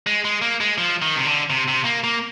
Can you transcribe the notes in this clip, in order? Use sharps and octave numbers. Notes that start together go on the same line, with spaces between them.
G#3
G#3
A#3
G#3
F3
D#3
C3
D3
C3
C3
A#3
A#3